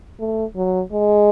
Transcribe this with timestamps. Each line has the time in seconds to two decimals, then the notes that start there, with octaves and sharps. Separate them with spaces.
0.20 A3
0.56 F#3
0.92 G#3